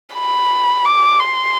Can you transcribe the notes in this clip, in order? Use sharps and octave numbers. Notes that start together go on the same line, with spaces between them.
B5
D6
C6